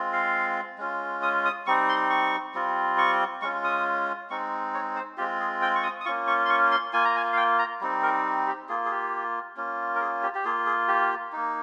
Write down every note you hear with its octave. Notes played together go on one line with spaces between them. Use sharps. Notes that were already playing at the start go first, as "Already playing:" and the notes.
Already playing: G#3 C4 F4
F5
G#3 C#4 F4
D#6
D#6
G3 C4 D#4 C#6
C6
C#6
G3 C4 F4
C#6
G#3 C#4 F4 C#6
D#6
G#3 C4 D#4 C#6
C#5
C5
G#3 C4 F4 G4
G#4
G5
C#6
D#6
D#6
A#3 C#4 F4 C#6
C#6
C6
C#6
C6
A#3 F4 G#5
A#5
G#5
F5
G5
A#5
G3 C4 D#4
A#4
G4
A#3 F4 G#4
G#4
G4
A#3 C#4 F4
A#4
G#4
G4
G4
A#3 F4 G#4
G#4
G4
A#3 D#4